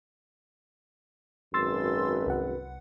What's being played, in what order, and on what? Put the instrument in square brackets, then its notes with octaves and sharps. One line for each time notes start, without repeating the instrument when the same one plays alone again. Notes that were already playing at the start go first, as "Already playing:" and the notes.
[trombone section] G#1 F#2 B4 [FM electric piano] C6 E6 A6
[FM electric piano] C2 F#5